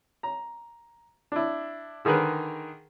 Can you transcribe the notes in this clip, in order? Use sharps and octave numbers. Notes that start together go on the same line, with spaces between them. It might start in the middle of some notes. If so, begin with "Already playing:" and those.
A#5
D4 E4
D3 D#3 G#4 A#4 B4